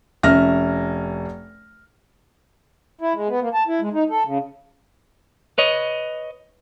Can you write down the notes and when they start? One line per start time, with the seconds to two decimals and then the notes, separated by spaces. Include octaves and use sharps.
0.23 F1 C#4 E5 F6 A#6
3.01 E4
3.15 G#3
3.28 B3
3.41 A#3
3.54 A5
3.67 E4
3.81 G#3
3.93 D#4
4.10 A4
4.25 C#3
5.58 B4 C#5 D#5